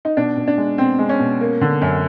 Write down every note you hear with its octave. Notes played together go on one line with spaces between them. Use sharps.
D#4
B2 D4
B2
D4
G#3
B2 C4
G#3
C#4
B2
A#3
D3
F#2